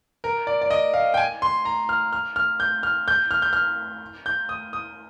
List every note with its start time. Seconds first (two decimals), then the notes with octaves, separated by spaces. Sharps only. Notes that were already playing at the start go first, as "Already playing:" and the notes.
0.24 A#4
0.47 D5
0.62 D5
0.71 D#5
0.94 F5
1.14 G5
1.17 G#5
1.42 C6
1.65 A#5
1.89 F6
2.13 F6
2.36 F6
2.60 G6
2.83 F6
3.08 G6
3.31 F6
3.42 G6
3.53 F6
4.26 G6
4.49 D#6
4.73 D#6